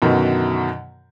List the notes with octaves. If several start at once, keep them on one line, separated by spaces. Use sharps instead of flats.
F#2 B2 D3 D#3 F#3